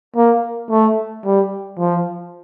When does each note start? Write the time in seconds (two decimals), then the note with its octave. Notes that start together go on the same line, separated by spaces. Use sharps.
0.16 A#3
0.71 A3
1.26 G3
1.79 F3